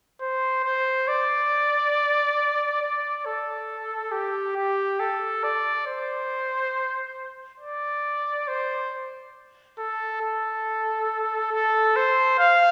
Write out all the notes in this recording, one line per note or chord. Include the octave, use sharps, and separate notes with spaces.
C5
C5
D5
D5
A4
G4
G4
A4
D5
C5
D5
C5
A4
A4
A4
C5
F5